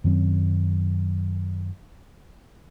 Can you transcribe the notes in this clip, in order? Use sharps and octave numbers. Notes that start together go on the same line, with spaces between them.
F#2 D#3 F#3 C4